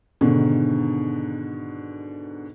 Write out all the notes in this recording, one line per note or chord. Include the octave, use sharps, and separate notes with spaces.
G#2 B2 D3 D#3